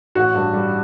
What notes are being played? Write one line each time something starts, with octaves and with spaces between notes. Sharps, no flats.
A1 F#4
G2
G3